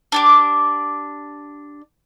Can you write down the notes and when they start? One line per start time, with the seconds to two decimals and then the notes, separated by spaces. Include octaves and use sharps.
0.12 D4 G4 D6